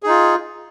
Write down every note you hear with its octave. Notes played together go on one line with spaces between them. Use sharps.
D#4 F4 G#4